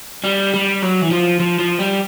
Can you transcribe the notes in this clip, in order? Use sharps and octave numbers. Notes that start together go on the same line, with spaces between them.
G3
G3
F#3
E3
F3
F3
F3
G3